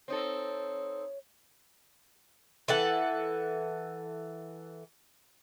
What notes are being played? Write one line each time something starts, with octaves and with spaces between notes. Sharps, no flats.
C4 D#4 A4 C#5
E3 A4 F#5